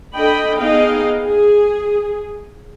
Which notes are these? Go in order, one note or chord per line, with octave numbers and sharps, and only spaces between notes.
D4 A4 D#5 G5 B5
B3 D#4 G#4 D#5 F5 G5
G#4